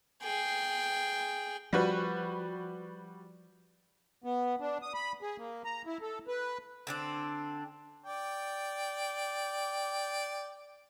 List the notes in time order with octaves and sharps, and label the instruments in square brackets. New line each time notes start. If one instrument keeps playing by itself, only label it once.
[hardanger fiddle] G#4 G5
[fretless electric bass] F3 [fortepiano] G3 F#4 B4
[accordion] B3
D4
D#6
B5
G#4
A#3
A#5
E4
A4
B4
[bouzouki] D3 C4 D4
[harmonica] D5 G5